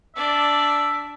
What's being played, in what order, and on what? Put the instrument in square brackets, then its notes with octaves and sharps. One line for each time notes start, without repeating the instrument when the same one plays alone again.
[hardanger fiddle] D4 D5 [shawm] E5